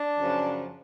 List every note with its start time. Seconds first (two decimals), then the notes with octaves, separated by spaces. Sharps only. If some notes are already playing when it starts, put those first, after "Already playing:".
Already playing: D4
0.18 F#2 C#3 F3